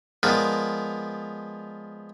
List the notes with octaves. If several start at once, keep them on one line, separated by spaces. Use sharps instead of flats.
F3 G#3 B3 F4 A#4 D5